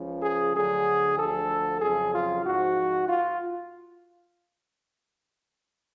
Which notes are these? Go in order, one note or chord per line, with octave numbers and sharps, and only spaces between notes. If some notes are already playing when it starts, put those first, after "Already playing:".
Already playing: C#2 C#3 F3
G#4
D2 D3 F#3 G#4
D2 D3 F3 A4
F2 C#3 F#3 G#4
F4
G#2 F3 F#4
F4